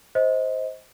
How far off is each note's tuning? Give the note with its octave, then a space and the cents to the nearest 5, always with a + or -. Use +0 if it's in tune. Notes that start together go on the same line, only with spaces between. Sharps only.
C5 +0 D#5 +25